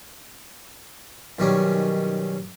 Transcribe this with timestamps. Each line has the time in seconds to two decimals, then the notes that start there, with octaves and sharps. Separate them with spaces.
1.39 B1 D#3 G3 C#4